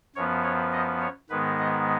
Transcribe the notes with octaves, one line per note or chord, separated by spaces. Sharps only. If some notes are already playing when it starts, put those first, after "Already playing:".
F#2 F3 B3 C#5
C#5
D#5
C#5
G#2 D#3 G#3 B3 B4
D#5